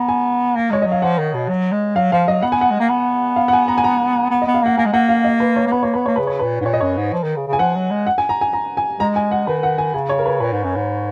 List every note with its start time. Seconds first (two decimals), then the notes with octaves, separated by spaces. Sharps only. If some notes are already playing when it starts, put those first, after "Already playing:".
Already playing: B3 A#5
0.08 G#5
0.55 A#3
0.70 G#3 C#5
0.82 F#3 D#5
0.92 F5
1.02 F3 F#5
1.19 D#3
1.34 B2
1.49 F#3
1.72 G#3
1.96 F#3 F5
2.12 F3 F5
2.28 F#3 D#5
2.42 B3 F#5
2.52 G#5
2.61 F#5
2.70 G#3
2.80 A#3
2.89 B3
3.36 F5
3.48 F#5
3.53 G#5
3.68 A#5
3.78 G#5
3.84 A#5
4.31 B3
4.42 D#5
4.47 B3
4.54 F5
4.62 A#3 F#5
4.77 A#3 G#5
4.86 G#3
4.93 A#3 F#5
5.09 F5
5.24 D#5
5.40 B4
5.56 C#5
5.67 A#3
5.72 B3 B4
5.83 A#3 C#5
5.94 B3 B4
6.06 A#3 C#5
6.16 C#3 B4
6.27 C#5
6.39 B4
6.42 A#2
6.61 G#2
6.65 A#2 C#5
6.73 D#5
6.81 F#2 C#5
6.97 G#2
7.13 F3
7.23 D#3
7.36 C#3
7.48 C#3
7.53 G#5
7.59 F3 F#5
7.75 F#3
7.91 G#3
8.07 F#5
8.18 G#5
8.29 A#5
8.41 G#5
8.53 A#5
8.77 G#5
8.99 G#3 A#5
9.16 G#5
9.31 F#5
9.47 D#3 B4
9.63 F#5
9.78 G#5
9.94 C#3 G#5
10.09 C#5
10.19 A#4
10.26 B4
10.40 A#2 B4
10.53 G#2
10.64 F#2
10.76 G#2